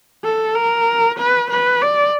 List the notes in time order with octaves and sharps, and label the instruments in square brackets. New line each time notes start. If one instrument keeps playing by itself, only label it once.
[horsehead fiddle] A4
A#4
B4
B4
D5